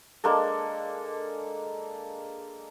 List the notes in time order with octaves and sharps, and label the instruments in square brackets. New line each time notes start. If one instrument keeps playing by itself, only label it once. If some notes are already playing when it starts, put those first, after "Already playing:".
[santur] G#3 A#3 D4 A4